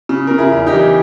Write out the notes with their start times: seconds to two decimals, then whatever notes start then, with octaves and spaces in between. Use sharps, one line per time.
0.09 C#3
0.27 C#3 A#4
0.38 E4 G#4
0.52 E2
0.67 D#4 G4
0.74 E3